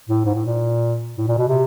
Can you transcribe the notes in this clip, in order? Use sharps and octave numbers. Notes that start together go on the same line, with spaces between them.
A2
G#2
A2
A#2
A2
A#2
B2
C3